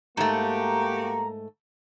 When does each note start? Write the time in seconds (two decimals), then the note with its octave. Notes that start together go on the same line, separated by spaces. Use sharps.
0.17 G#2 A3 A#3 F#4 G4 A#5